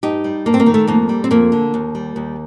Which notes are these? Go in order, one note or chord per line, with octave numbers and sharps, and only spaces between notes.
G2 D#4 G4
G3
G2 A#3
C4
A#3
D#3
A3
F2 A#3
G3
C4
F2 A#3
D3
D#2
G3
D#2